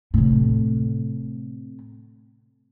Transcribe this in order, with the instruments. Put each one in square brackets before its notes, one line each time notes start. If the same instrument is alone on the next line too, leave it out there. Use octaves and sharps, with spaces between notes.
[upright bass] A2 C3